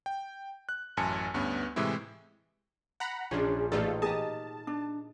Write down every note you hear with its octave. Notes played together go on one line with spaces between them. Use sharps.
G5
F#6
A1 F#2 G#5 A5 C#7
D2 G2 B3 C#4
A2 C3 E3 G#3 E4
F#5 A#5 B5
A#1 C#4 D4 G#4 C6
A1 A2 A3 D#4 F4 A4 D5
G4 G#4 A#4 D#5 A5
D4